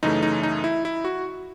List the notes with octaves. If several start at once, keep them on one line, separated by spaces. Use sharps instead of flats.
F#2 C#3 E3 A3 D#4
D#4
D#4
E4
E4
F#4